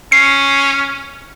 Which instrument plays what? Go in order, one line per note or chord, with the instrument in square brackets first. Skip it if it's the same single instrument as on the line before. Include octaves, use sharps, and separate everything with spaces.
[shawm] C#4 [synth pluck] C7